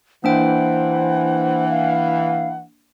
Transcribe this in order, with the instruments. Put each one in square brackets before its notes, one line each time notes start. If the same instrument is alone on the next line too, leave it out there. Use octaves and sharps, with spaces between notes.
[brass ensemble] E3 [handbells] A#3 D4 G5 [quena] C5 [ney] F#5
[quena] F5